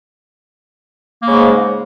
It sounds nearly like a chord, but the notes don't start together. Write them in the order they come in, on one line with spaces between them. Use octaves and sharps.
A#3 C#3 G#3 G#2